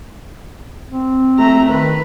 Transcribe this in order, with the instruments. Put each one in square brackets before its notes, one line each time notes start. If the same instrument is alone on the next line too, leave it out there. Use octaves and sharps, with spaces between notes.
[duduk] C4
[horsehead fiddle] A3 A#5
[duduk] D#3 [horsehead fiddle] B4